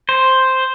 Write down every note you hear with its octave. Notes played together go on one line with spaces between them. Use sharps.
C5